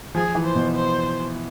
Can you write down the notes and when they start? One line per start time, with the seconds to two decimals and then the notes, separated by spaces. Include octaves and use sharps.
0.15 F3 G#4
0.35 E3
0.46 C5
0.55 B2
0.75 C5